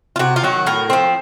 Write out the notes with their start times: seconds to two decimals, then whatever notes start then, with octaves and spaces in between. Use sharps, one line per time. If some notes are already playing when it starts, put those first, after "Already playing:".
0.16 F4
0.19 C3 F#4
0.36 F4
0.43 D#3 F#3 F#4
0.66 A2 A#4
0.90 F3 C4